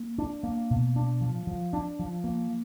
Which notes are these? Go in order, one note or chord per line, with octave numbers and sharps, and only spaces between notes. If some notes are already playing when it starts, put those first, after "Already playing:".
Already playing: A#3
D4
A#3
B2
D4
F3
F3
D4
F3
A#3